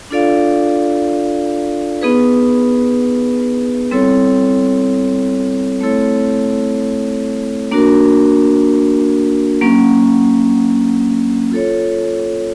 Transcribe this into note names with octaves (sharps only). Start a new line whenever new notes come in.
D4 F4 A4 D5 F5
B3 D#4 G#4 B4
G3 C4 E4 A4 C#5
A3 C4 E4 A4 C#5
A#3 D4 F#4 A#4
F#3 A#3 C#4
F4 A4 C#5